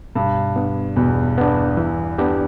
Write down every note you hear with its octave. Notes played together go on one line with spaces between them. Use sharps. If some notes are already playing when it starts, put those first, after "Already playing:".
G2 B2
B3 D4
E2 B2
B3 D4
E3
B3 D4 G4